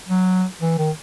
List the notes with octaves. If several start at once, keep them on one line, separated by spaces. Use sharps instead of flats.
F#3
E3
D#3